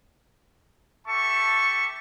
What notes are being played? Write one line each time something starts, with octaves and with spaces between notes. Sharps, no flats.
G4 A4 E5 A5 C#6